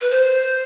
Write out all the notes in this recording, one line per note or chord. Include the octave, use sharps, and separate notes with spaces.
B4
C5